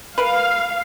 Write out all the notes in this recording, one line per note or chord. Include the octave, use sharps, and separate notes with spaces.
A#4 B4 F5